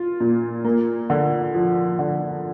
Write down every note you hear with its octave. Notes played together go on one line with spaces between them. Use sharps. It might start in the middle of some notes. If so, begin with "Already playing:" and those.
Already playing: F4
A#2
A#3
D3
F3
D3